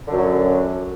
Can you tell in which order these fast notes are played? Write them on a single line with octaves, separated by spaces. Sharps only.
D3 F#2 F#3